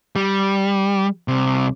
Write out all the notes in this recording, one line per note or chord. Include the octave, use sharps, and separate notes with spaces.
G3
C2 C3